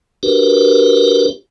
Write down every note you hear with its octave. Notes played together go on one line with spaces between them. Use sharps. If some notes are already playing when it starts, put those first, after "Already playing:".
D4 F#4 G4 A#4 B4